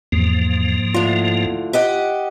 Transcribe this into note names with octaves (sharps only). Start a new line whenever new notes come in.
E2 G#2 F3 A#3
A2 D3 F4
G4 D#5 F#5